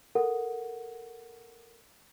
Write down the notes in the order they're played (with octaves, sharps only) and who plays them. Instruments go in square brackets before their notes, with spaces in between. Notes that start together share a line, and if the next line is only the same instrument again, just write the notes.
[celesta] A4 A#4 F#5